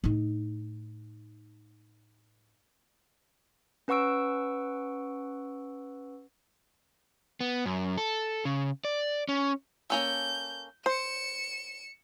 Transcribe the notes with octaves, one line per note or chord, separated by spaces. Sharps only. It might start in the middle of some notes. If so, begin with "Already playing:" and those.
A2 D#4
C#4 B4 F#5 C#6 E6 D7
B3
F#2
A4
C#3
D5
C#4
A#3 C#4 A4 G6
C5 C#7 E7